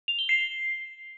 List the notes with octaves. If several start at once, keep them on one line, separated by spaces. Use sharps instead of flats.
F7
G7
C7